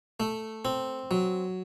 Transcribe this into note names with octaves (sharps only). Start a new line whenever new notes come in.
A3
C4
F#3